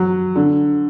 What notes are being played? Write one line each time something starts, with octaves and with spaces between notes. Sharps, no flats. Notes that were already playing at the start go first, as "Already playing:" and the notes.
Already playing: F#3
D3